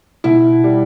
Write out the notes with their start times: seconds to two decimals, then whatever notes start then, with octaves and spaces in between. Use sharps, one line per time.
0.24 B2 E4
0.64 G3